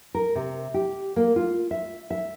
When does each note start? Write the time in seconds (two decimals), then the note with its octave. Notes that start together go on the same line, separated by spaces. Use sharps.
0.15 A#4
0.35 C3
0.74 G4
1.16 A#3
1.36 F4
1.71 E5
2.10 E5